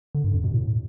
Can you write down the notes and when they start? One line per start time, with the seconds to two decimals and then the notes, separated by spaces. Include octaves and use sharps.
0.15 D3
0.24 G2
0.34 F2
0.44 B2
0.54 A2